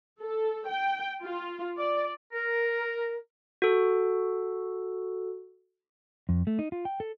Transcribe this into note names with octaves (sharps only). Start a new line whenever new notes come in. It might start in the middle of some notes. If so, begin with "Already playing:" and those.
A4
G5
F4
D5
A#4
F#4 A4
F2
A3
D#4
F4
G5
A4